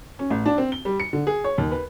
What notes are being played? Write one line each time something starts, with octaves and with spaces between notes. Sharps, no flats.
C#4
A1
D4
C4
G7
G3
C#7
D3
G#4
C#5
D#2
B4